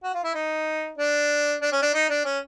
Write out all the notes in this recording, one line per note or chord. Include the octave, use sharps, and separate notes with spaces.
F#4
F4
E4
D#4
D4
D4
C#4
D4
D#4
D4
C#4